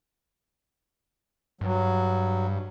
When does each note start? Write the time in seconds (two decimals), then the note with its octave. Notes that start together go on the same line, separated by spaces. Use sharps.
1.61 G2 F#3